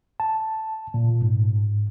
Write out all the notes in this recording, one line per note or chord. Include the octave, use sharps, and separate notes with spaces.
A5
A#2
G#2